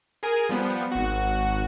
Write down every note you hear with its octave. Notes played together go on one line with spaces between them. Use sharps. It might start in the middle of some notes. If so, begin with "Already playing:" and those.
G#4 A#4 G#5
F3 G3 B3
G#1 F#4